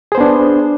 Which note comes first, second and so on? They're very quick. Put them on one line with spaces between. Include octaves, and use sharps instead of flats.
G#4 C5 B3 D4